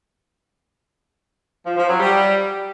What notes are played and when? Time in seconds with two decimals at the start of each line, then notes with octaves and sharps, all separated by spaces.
1.64 F3
1.76 F3
1.88 F#3
1.99 G3